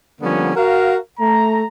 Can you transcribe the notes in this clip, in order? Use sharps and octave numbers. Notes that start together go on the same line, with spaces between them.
D3 F3 G3 A#3 B3 C#4
F#4 A#4 F5
A3 A#5